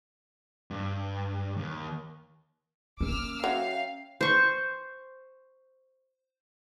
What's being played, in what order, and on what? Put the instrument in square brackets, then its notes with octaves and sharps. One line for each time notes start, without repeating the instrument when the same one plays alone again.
[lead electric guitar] G2
D#2
[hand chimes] A#3 A#4 [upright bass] C#4 [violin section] D6 E6 F6
[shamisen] F#3 [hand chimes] E5 G5 [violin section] F5
[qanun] C5 C#6